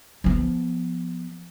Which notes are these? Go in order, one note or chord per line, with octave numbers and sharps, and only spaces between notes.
F3 B3